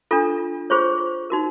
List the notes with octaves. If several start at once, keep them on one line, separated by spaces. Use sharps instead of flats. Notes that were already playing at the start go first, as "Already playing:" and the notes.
D4 F4 A4
F4 G#4 C5 C#5 C#6
D#4 F#4 A#4